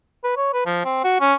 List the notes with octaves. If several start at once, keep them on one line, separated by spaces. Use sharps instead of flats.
B4
C#5
B4
F3
C4
F#4
C#4